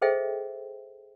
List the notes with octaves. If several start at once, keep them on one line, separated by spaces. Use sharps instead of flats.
G#4 A4 C5 D#5 E5 G5